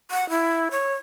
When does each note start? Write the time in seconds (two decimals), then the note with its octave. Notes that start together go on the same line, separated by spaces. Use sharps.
0.11 F#5
0.30 E4
0.71 C#5